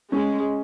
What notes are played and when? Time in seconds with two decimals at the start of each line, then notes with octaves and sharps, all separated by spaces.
0.12 G#3 C#4